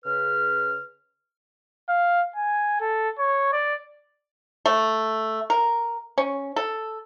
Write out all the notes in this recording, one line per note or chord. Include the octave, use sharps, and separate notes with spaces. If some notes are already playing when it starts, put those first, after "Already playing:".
C#3 B4 F6
F5
G#5
A4
C#5
D5
A3
A#4
C#4
A4